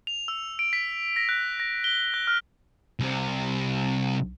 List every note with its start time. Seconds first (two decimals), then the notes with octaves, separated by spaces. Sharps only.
0.07 F7
0.28 E6
0.59 D7
0.73 B6
1.16 A#6
1.29 F#6
1.60 A#6
1.84 G7
2.14 F#6
2.27 F6
2.99 C2 C3